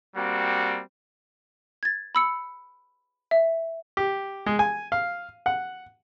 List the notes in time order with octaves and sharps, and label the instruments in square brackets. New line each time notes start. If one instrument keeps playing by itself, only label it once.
[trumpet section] G3 A#3 C4 F#4
[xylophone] G#6 A6
B5 E6 C#7
E5
[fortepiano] G4
G#3
G#5
F5
F#5